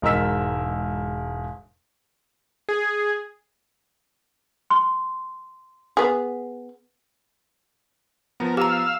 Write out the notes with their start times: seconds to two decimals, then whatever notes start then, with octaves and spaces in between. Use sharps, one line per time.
0.02 E1 G#2 A#4 D#5 E6 B6
2.69 G#4
4.70 C6
5.97 B3 G#4
8.40 F3 B3 A#4
8.57 G4 F5 A#5 E6